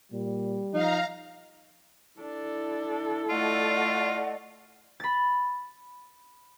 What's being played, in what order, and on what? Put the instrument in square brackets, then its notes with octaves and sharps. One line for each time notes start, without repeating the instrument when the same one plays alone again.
[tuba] A#2 [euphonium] G3
[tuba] F3 [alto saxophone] D#4 [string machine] F5 A#5
[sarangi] D4 [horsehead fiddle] E4 A4
[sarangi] A3 [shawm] F4 [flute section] D5 D#5 F#5
[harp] B5 A6